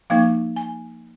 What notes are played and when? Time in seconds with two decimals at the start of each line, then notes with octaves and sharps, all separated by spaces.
0.10 F3 A#3 D#4 F5
0.56 G#5